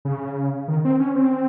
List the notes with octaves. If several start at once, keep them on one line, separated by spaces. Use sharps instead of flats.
C#3
D#3
C4
C#4
C4